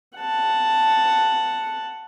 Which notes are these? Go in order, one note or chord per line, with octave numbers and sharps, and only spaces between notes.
F#5 A5